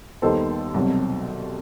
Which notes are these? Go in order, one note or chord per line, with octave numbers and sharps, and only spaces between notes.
D#2 D#3 G3 B3 A4 C5
C2 B2 F#3